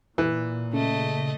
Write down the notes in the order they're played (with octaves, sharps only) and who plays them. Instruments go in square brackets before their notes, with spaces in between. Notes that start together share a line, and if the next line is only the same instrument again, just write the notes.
[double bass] A#2 [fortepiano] E3
[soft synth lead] C#3 [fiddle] A3 D#5